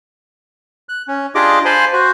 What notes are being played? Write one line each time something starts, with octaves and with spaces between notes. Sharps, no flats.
F#6
C#4
D4 F4 G4 G#4 D#5 D6
C5 F5 G#5 A5 B5 C6
F#4 C5